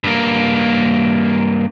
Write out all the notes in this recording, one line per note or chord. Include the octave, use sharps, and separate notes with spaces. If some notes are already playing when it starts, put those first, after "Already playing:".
G2 A#3